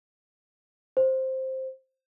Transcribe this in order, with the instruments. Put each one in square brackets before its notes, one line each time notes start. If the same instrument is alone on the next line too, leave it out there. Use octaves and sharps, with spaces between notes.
[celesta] C5